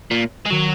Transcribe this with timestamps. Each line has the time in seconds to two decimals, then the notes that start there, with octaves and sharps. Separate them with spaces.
0.11 A#2
0.45 G#3
0.50 D#3 F#3